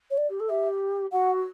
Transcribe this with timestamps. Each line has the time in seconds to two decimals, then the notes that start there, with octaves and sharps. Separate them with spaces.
0.11 C#5
0.18 D5
0.29 G4
0.39 A4
0.49 G4 E5
1.12 F#4 F#5